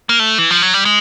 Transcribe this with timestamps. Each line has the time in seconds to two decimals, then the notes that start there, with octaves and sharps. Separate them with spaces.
0.09 A#3
0.19 A3
0.38 E3
0.51 F3
0.62 F#3
0.74 G3
0.85 G#3